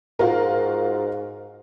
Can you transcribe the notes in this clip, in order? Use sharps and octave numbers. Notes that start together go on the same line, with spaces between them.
G#2 F4 F#4 A#4